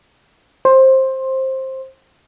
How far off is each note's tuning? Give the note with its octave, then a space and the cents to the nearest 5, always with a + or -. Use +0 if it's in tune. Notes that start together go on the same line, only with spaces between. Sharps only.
C5 +15